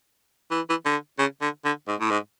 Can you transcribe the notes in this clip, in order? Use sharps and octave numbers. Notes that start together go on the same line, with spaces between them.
E3
E3
D3
C#3
D3
D3
G#2
A2
G#2